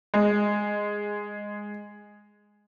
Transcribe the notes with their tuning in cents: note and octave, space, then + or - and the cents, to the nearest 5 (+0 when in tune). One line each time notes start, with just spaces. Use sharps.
G#3 -10